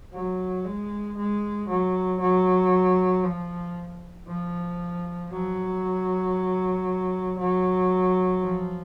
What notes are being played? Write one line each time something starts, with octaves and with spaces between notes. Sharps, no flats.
F#3
G#3
G#3
F#3
F#3
F3
F3
F#3
F#3
F3